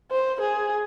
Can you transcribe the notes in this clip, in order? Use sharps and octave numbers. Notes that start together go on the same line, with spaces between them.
C5
G#4